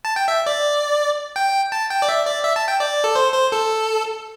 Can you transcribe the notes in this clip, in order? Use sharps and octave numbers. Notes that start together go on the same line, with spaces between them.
A5
G5
E5
D5
G5
A5
G5
D5
E5
D5
E5
A5
G5
D5
A4
C5
C5
A4